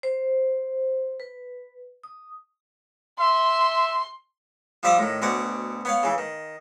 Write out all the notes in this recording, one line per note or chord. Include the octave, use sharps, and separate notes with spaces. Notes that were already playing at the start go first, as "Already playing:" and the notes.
C5
B4
D#6
E5 C6
F3 G3 E5 F5 D6 D#6
A2 D#3
D2 B2 C#5 D5 F#5
B3 C#5 F5
C#3 E3
D#3